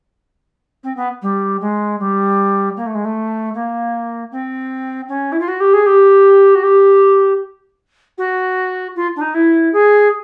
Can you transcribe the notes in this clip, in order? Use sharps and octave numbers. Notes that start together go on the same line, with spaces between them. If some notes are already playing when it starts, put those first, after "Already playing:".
C4
B3
G3
G#3
G3
A#3
A3
G#3
A3
A#3
C4
C#4
E4
F4
F#4
G4
G#4
G4
F#4
G4
F#4
F4
D4
D#4
E4
G#4